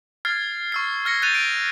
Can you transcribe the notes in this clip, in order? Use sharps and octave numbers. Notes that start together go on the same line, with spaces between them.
F6 G#6 A6 C7
C#6 E6 C7
F6 G#6 A#6 C#7
F#6 G6 A6 C7 D#7 F7
D7